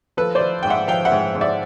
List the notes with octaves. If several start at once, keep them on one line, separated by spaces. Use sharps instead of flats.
F3 A4 B4
C5 D5
F3
G#2 G5
E5 F#5
F3 F5 G5
E5 F#5
G#2
G#2
D5 E5